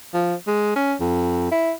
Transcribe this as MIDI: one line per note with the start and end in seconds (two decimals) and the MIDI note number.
0.14 0.35 53
0.47 0.74 56
0.76 0.94 61
1.00 1.50 41
1.51 1.72 64